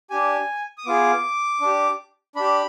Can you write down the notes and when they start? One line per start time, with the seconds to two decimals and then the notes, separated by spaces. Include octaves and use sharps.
0.10 D4 G4 G#5
0.78 D#6
0.86 B3 F4 G#4 D6
1.61 D4 G4
2.36 D4 G4 B5